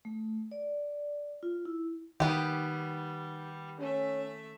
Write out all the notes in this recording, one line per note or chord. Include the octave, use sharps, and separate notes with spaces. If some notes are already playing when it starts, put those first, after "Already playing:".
A3
D5
F4
E4
D#3 G3 B3 G4
A3 C#4 E5